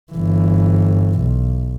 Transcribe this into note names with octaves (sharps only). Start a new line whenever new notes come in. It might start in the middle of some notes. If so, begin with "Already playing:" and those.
G1 E3
B1